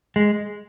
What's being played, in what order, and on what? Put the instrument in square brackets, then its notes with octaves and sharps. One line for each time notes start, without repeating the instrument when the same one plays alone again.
[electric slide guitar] G#3